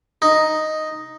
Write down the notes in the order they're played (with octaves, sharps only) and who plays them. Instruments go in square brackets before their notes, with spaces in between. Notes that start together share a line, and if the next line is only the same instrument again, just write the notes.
[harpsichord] D#4